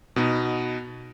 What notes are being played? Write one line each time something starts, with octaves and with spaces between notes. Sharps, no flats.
B2 B3 D#4